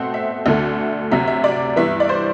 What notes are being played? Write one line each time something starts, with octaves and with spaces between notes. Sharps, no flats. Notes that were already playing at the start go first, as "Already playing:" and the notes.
Already playing: B2 A3 C4 F#5
E5
D2 D3 A3 D4
D2 C3 F#3 E5
E5
D5
G2 E3 B3 E5
D5
C5